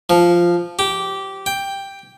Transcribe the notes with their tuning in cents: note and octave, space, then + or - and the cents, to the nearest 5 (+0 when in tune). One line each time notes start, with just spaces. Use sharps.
F3 -5
G4 -15
G5 +5